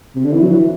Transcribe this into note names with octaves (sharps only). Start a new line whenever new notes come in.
C3
D3
E3
F#3
E3